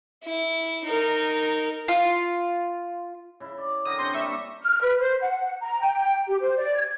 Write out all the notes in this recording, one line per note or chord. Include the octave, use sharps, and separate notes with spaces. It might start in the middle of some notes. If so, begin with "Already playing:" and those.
E4
D#4 A#4
F4
C#3 E4
D5
D3 A#4 G5 D#6 A#6
C3 C#4 C6 C#6 G6 A#6
G3 A#3 D4 E5 C#6
F6
B4
C5
F#5
A#5
G5
G4
C5
D5
G#6